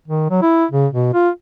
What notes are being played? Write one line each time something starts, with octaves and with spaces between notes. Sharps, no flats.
D#3
F#3
E4
C#3
B2
F4